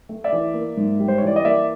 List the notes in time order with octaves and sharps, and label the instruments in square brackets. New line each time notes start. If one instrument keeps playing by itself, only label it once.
[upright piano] A3
D5 E5
E3
A#3
G#2
G3
C5
C#5
E3 D5
D#5
A#3 D5 E5